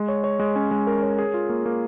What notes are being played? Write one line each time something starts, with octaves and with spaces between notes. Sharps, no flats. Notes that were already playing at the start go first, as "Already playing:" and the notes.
Already playing: G#3
C#5
C#5
G#3
C#4
G#3
A#4
C#5
G#4
F4
A#3
A#3